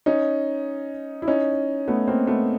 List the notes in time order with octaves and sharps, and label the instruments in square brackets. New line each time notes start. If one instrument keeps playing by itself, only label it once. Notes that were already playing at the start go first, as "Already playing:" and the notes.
[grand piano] C#4 D#4
E4
C#4 D#4
A3 B3
A#3 C4
A3 B3